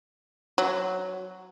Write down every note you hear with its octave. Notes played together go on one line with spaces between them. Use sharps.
F#3